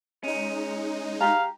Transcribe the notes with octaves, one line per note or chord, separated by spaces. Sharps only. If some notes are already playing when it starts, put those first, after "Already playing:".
G#3 C#4 D#4
G4 F5 A#5